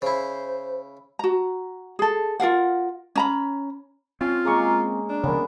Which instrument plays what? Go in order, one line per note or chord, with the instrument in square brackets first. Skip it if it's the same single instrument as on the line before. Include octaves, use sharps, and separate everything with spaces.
[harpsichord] C#3 E4 [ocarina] C5
[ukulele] F#4 A#5
G#4 A4
F4 A#4 F5 F#5
C#4 A#5 B5
[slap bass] C4 [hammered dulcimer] C#4 [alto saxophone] F4
[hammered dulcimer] G#3 A#3 A#4 [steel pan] G#4 G#5 C#6
[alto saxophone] D4
[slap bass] C#3 F3 [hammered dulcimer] B3 G#5 [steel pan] A#4 C#5